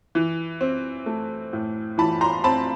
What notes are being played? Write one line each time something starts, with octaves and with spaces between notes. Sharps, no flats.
E3
C4
A3
A2
E3 A5 B5
A#5 C6
C4 A5 B5